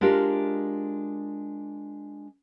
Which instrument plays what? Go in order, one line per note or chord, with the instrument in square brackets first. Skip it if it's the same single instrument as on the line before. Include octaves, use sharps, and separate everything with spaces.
[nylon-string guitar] G#3 D4 F4 G4 A#4 G5